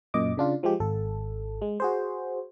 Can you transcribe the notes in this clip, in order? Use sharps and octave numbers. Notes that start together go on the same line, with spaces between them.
F#2 A#2 D#5 D6
C#3 D4 F4
F3 G#3 G4
G#1 A4
G#3
F#4 G#4 C5